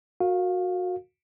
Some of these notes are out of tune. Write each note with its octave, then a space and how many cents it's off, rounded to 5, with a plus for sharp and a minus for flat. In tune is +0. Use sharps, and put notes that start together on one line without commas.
F#4 -20 A#4 -30 F5 +15